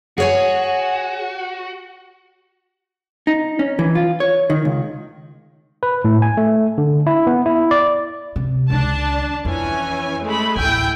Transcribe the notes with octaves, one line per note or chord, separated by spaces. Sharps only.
F#4 G#4 C#5 G#5
D#4
C#4
E3
F4
C#5
D#3
C#2
B4
A2
G#5
A3
D3
E4
B3
E4
D5
C3
C#2 D#3 D4 A5
F2 E3 C#4 G#5
G#3 A3 B5
A1 D2 E4 G5 G#5